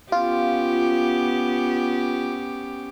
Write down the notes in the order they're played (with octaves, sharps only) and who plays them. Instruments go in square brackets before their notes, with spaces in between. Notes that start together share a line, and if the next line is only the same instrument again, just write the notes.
[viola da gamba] B3 C#4 G4 [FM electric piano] F4